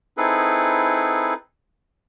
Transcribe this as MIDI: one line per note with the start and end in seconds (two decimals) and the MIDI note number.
0.18 1.34 60
0.18 1.34 63
0.18 1.34 64
0.18 1.34 68
0.18 1.34 69
0.18 1.34 71